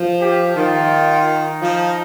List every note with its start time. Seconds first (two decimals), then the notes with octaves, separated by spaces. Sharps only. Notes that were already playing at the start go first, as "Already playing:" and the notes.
Already playing: F3
0.21 G4
0.56 D#3 F4
1.26 D#4
1.62 F3